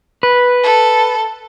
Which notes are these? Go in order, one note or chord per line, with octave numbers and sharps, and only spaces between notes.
B4
A4